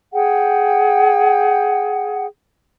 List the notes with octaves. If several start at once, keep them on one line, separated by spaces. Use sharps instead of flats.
G#4 F#5 G5